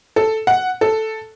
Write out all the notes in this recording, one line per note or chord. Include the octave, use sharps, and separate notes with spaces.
A4
F#5
A4